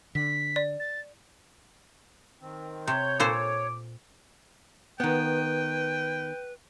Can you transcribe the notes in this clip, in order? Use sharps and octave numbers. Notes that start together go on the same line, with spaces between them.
D3 B6
D5
A6
D#3 C4
C3 C#5 G6
A#2 A4 C5 D6
D#3 B3 B4 G5